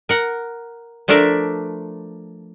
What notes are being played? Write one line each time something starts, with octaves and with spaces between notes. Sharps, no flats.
A#4 F#5
F3 A3 D4 A#4 D5 E5